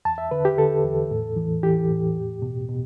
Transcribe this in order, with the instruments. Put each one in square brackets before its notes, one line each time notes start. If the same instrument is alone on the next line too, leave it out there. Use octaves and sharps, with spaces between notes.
[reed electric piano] E2 A5
E5
D3 B4
G4
D3 A4
E2
A2
E3
E3 G4
A2
E2
B2
B2